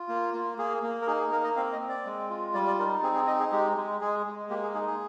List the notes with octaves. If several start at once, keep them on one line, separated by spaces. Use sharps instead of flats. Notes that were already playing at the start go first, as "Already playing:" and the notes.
Already playing: F4
A#3
A#3
A#3 G#4
A#3
A#4
D#4 G#4
G#4
A#3 A#4
D#5
C4 F5
D#5
C4
D5
G#3
F4
G3 D5
D5
D#4 A#4
C4 G#4
G#4
D#4 D#5
G#4
G#3 G4
G#3
G#3 G#4
G#3
A#3 G4
G#4
D#4 G#4
G#4